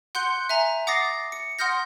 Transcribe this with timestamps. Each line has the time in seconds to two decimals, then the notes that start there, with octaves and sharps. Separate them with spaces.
0.15 F#5 C6 F#6 G6 C#7 G7
0.49 E5 G#5 A#5
0.87 F#5 D6 D#6 A6 A#6 C7
1.32 C#7
1.59 F#5 C6 D#6 F6 G6 A#6